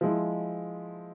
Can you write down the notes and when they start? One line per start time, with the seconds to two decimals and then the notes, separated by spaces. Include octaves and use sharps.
0.01 F3 G#3 E4